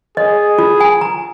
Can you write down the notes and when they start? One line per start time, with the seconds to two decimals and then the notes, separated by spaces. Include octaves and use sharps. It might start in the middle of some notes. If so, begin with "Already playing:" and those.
0.17 G#4 D#5
0.59 F4
0.80 G#5
1.01 A#5